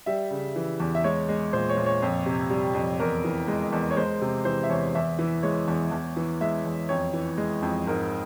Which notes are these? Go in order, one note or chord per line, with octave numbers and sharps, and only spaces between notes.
G3 E5
C#3
E3
E2
E5
G#3 C#5
G#3
A#2 C5
C#5
A#2
C#5
F2
C3
G3
F2
E2 A#4
E3
G#3
E2
C#5
G#3 C5
C3
E3 C5
E5
E2 C#5
E2 E5
E3
G#3 C#5
E2
E2
E3
G#3 E5
E2
F2 C#5
E3
G#3
F2
G#2 A#4